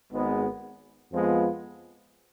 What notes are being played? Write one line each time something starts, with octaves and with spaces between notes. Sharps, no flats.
G#1 G#2 G#3 B3
F2 F3 G#3 B3 F4